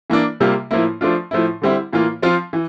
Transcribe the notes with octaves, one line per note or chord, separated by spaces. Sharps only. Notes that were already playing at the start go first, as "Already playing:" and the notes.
E3 A#3 D4
C3 G3 A#3 F4
A2 F3 A#3 E4
F3 A3 D4 F4
A2 F3 A3 E4
D3 G3 C4 E4
A2 E3 A#3 F4
F3 C4 F4
E3